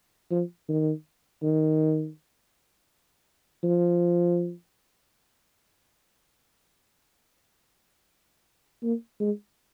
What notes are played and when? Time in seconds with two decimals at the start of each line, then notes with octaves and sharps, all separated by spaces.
0.31 F3
0.69 D#3
1.42 D#3
3.64 F3
8.83 A#3
9.20 G#3